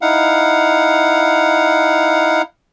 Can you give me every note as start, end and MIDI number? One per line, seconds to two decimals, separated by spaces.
0.02 2.42 63
0.02 2.42 64
0.02 2.42 77
0.02 2.42 78